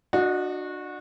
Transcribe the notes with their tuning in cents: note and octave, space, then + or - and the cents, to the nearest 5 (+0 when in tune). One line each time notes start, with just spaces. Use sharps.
D4 +30 F#4 -20 D#5 +0